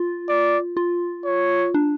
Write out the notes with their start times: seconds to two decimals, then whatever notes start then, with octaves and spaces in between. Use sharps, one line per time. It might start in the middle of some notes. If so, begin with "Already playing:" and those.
Already playing: F4
0.29 D5
0.77 F4
1.25 C#5
1.74 D4